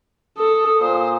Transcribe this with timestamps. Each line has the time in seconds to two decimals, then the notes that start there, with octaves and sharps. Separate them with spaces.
0.37 A4 D#6
0.81 A#2 C5